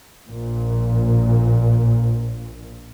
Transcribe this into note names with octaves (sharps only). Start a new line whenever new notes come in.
A#1 A#2